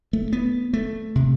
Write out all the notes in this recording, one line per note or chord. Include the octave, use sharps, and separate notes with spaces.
A3
B3
A3
C3